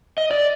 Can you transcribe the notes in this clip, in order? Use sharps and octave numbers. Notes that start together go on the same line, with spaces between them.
D#5
D5